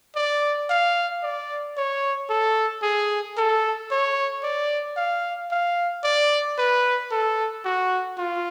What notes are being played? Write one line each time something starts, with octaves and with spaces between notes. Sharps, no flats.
D5
F5
D5
C#5
A4
G#4
A4
C#5
D5
F5
F5
D5
B4
A4
F#4
F4